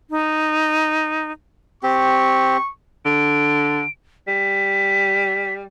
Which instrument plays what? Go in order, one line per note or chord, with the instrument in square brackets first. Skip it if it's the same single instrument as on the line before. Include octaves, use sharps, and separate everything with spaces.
[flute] D#4
[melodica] C4 G4 [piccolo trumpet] C#6
[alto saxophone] D3 [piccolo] D7
[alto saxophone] G3 [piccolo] B6